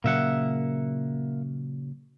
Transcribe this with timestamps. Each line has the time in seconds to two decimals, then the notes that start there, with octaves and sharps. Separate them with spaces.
0.04 A#2 C#3 F#3 A#3 E5 F#5